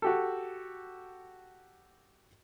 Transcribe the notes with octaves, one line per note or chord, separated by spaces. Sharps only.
F#4 G4 A4